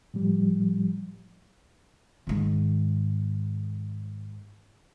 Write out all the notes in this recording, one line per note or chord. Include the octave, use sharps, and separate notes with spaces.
A2 F3 G3
G#2 D#3